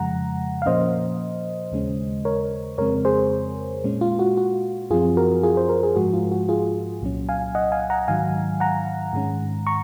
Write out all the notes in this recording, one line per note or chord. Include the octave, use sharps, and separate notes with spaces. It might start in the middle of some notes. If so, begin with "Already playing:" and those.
Already playing: F2 C#3 F3 G#3 F#5 A#5
F5
A#2 F3 A#3 C#4 C5 D#5
D#2 C#3 G#3 C#4
A#4 C#5
F2 C#3 G#3 C4 A#4 C#5
G#4 C5
A#2 G#3 C#4
F4
F#4
F#4
F#2 F3 C4 F4 G#4
F#4 A#4
F4 G#4
C5
A#4
G#4
G#2 F3 G#3 F#4
F4
F#4
F4 G#4
C2 A#2 F#3 C#4
F5 G#5
D#5 F#5
F5 G#5
F#5 A#5
G#2 D#3 F#3 F5 G#5
F#5 A#5
G#2 D#3 G#3 C#4
A#5 C#6